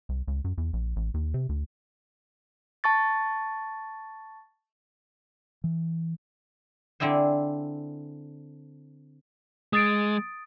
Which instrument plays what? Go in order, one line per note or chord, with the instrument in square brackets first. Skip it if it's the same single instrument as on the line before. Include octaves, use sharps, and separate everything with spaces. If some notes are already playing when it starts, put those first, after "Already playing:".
[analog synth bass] C2
C#2
F#2
E2
A#1
A1
D#2
C3
D2
[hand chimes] A5 C#6 A6
[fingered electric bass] E3
[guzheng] D3 C4 E4 G#4 C5
[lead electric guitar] G#3 [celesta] D#6 A6 D7